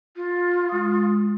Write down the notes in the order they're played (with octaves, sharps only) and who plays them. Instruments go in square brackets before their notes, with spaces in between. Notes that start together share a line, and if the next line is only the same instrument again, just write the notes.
[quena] F4
[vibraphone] G#3 D#6